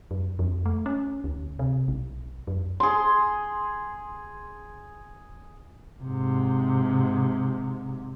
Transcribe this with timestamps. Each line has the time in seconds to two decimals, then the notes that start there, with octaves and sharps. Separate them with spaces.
0.11 F#2
0.39 F2
0.66 A3
0.86 C#4
1.24 D2
1.59 C3
1.88 B1
2.47 F#2
2.80 G#4 C6
6.03 G#2 C3